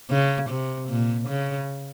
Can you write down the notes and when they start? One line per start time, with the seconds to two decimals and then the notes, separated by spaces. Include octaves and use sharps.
0.11 C#3
0.50 C3
0.89 A#2
1.28 C#3